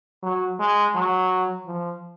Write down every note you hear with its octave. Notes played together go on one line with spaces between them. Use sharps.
F#3
G#3
F#3
F3